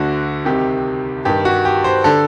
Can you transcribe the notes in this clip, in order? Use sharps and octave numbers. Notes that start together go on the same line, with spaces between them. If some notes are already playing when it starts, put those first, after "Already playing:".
Already playing: D2 D3 F#4
C2 C3 D#3 G4
G2 D#3 G4
F#4
G4
C5
D3 A4